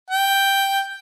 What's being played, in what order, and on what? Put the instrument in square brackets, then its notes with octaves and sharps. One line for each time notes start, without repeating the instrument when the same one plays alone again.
[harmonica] G5